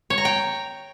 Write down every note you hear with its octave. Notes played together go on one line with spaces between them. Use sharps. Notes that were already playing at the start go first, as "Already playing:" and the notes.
C#5
A#5
G5